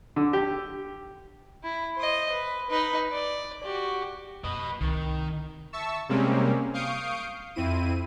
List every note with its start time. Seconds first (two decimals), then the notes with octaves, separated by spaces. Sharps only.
0.16 D3
0.33 G4
1.63 E4
1.97 C5 D#5
2.31 B4
2.70 D#4 B4
3.12 D5
3.63 F#4 G4
4.44 F#2 B4 D#5
4.81 C2 D#3
5.73 E5 A5 C#6 E6
6.09 C3 G3 G#3 A#3 C4 C#4
6.73 F5 C#6 D#6 G6 C7 D7
7.55 F2 C4 E4 D#7